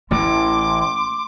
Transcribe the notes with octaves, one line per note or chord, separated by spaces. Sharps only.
A1 A2 E3 A3 C#4 C6 D6